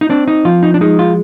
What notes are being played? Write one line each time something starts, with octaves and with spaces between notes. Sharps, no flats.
D#4
C4 D4
D#4
F3 F4
D#4
D4
G#3 D#4
F4